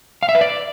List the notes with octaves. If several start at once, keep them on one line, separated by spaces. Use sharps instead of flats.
F5
E5
B4
D5